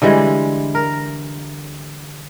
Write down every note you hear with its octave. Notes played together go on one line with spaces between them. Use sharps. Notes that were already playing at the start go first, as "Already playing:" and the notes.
D3 E3 G3 G#3
A#4